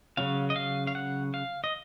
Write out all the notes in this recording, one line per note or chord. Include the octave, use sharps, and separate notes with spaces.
C#3 F#3 C#4 F5
D#5
F5
F5
F#5
F5
D#5